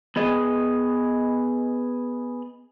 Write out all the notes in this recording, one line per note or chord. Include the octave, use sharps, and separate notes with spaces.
B3 G#4 D#5